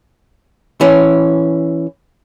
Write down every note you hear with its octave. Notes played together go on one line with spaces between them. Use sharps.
E3 C#4